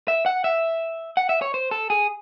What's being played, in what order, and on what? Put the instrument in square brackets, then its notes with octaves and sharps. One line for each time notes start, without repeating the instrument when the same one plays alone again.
[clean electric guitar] E5
F#5
E5
F#5
E5
C#5
C5
A4
G#4